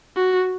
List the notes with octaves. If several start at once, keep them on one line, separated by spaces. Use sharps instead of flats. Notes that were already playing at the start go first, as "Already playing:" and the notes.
F#4